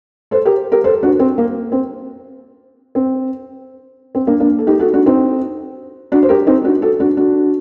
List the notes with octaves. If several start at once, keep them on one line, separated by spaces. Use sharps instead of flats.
A4 C5
G4 A#4
G4 A#4
A4 C5
D4 F#4
C4
A#3
C4
C4
C4
A#3 D4
A#3 D4
A4
D#4 G4
F#4 A4
D4 F#4
C4 D#4
D4 F#4
C5
G4 A#4
C4 D#4
D4 F#4
F#4 A4
D4 F#4
D4 F#4